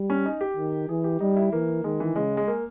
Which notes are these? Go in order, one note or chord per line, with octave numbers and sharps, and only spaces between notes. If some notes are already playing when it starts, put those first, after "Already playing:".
Already playing: G3
C#4
D#4
G4
D#3
E3 G#4
G4
G3 D#4
E4
E3 A#3
D#3 G#3
E3
C#3 G#3
G#3
A#3